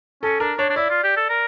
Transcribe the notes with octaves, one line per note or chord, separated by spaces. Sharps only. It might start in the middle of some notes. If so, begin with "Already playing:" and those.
C#4 A4
D4 A#4
D4 C#5
D4
E4 D5
F4
G4
A4
A#4